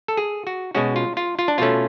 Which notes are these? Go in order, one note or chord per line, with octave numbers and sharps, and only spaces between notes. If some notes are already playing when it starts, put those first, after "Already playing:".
A4
G#4
F#4
B2 G#3 C#4 F#4
F4
F4
F4
D4
B2 A3 C#4 F4